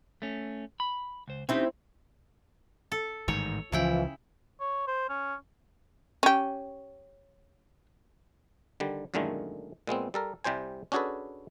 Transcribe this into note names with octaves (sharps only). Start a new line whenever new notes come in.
A3 C#4
B5
C#2 C5
C4 C#4 D#4 E4 G4
A4
A1 G#2 D#3 C#5
C#2 C#3 E3 F3 E4 G5
C#5
C5
C#4
C#4 G4
D3 D#3 G3
F#2 A#2 D3 D#3 G#3 A3
A#2 G#3 B3 C4
G3 A4 A#4
C2 C3 G3 C5 G#5
C#4 D4 F#4 G#4 A4 B4